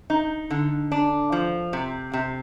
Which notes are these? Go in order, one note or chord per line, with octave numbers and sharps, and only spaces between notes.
D#4
D3
D4
F3
C3
C3